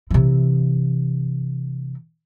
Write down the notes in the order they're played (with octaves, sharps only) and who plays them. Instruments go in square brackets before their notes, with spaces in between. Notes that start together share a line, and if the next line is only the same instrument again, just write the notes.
[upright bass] C3 E3